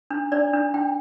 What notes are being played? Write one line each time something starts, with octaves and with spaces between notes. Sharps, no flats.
D4
D4 D5
D4
D4 G5